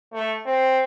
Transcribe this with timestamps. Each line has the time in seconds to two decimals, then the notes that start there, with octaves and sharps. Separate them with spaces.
0.13 A3
0.46 C4